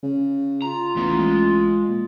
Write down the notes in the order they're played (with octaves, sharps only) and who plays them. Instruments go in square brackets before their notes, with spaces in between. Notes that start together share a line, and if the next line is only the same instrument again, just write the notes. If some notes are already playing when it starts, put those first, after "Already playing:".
[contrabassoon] C#3
[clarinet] F4 [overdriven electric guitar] A#5
[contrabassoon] A1 [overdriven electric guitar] E2 B3
[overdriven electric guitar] G#3
[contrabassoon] A#2